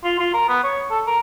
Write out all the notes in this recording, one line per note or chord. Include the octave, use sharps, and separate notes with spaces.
F4
F4
A#4
B3
C#5
A4
A#4